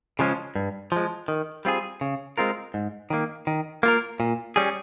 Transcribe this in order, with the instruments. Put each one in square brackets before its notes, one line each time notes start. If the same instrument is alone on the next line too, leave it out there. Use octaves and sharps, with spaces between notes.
[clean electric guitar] C#3 F3 G#3 C#4
G2
F3 G#3
D#3
G3 C4 F4 G#4
C#3
G#3 C4 F4 A#4
G#2
D#3 A#3
D#3
A#3 F4 A#4
A#2
G3 C#4 G#4